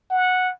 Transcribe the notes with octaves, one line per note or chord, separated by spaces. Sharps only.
F#5